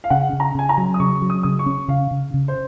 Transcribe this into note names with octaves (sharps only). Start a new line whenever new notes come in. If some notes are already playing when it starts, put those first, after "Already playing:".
F5
C#3 F#5
C#3
A#5
C#3 G#5
A#5
F#3
D#6
C#3 C#6
F#3
D#6
C#3 D#6
C#6
C#4
C#3 F5
C#3
C#3
C5